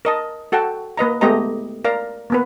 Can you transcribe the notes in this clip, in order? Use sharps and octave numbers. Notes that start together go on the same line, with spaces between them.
A#4 D#5 A5
F#4 A4 F#5 G5 A5
A#3 B4 D#5 A#5
G#3 A3 B3 G4 D#5 A#5
A#4 D5 F5 A#5
A#3 B3 B4